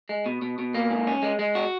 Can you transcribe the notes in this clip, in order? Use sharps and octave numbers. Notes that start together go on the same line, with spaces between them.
G#3
B2
B2
B2
A#3
G#2
C#4
G#3
G#3
F#4